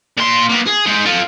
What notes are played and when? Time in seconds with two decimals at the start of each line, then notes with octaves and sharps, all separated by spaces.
0.17 A#2 C6
0.49 A#3 B3
0.67 G#4
0.86 G#3 D#4
1.05 F4 A4